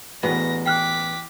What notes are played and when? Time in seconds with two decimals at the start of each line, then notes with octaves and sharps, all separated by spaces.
0.23 A1 E2 B3 F#4 A#6
0.66 G5 D6 F6 F#6 B6